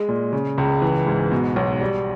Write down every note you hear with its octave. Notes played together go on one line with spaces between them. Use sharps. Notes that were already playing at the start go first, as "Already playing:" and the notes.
Already playing: G#3
A#2
C#3
C#2
E3
G#2
B2
B1
G3